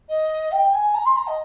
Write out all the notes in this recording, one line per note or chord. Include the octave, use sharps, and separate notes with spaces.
D#5
G5
G#5
A#5
C6
A#5
D#5